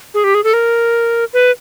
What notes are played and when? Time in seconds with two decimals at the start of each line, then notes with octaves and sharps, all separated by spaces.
0.14 G#4
0.24 G4
0.35 G#4
0.44 A4
0.53 A#4
1.33 B4